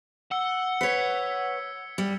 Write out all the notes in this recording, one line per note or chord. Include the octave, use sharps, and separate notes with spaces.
F#5 E6 C#7 G7
B4 C#5 G#6 B6 C#7
G3